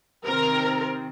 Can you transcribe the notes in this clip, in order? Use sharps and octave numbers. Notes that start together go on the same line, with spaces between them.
C3 D#3 C4 A#4